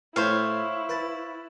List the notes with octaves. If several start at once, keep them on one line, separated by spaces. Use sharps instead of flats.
A2 A3 E4 C5 C#5 F5
B4 A5